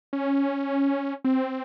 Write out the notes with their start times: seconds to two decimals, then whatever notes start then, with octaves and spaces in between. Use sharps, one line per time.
0.13 C#4
1.25 C4